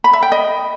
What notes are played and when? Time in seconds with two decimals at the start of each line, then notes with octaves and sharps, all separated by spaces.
0.04 B5
0.13 E5
0.23 G5
0.32 D#5